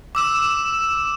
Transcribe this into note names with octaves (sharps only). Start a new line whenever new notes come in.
D6 E6 E7